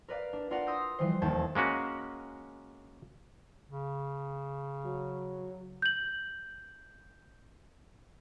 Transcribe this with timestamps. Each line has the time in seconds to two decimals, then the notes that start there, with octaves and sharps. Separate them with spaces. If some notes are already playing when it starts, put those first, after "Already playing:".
0.08 A#4 B4 D5 F5
0.33 D4
0.51 D4 F4 A#4 D5 F5 F#5
0.67 C6 D#6 E6 G6 A#6
0.99 E3 F3 G3 G#3 C5
1.22 E1 D#2 F3 A5 G6 G#6
1.55 G#3 A#3 C#4 F#4
3.68 C#3
4.85 F#3
5.82 G6 F#7